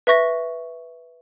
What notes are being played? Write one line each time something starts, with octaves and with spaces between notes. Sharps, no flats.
B4 E5 C#6 A#6